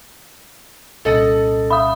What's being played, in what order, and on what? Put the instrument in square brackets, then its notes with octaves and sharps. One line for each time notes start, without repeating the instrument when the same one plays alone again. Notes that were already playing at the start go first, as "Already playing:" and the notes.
[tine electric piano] C2 A#2 C#4 [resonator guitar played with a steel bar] A4 D#5 [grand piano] A6 C#7 F#7
[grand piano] E5 F5 [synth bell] B5 D#6